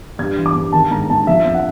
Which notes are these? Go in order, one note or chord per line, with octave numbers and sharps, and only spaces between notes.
G2 G#6
E3
D6
G2
D#3 A5
G#2 A#5
G#2 A5
F3 E5
F2
F#5